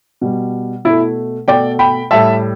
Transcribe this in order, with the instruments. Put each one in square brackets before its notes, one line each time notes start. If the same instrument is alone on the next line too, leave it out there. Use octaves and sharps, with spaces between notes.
[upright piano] B2 G3
B2 A3 E4
B2 A3 D5 G5
G5 B5
A2 G3 E5 A5